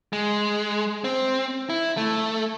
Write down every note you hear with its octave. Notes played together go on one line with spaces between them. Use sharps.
G#3
C4
E4
A3